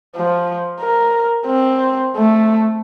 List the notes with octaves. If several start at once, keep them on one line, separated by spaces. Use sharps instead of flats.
F3
A#4
C4
A3